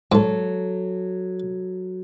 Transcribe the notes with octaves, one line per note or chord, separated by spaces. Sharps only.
G#2 F#3 A4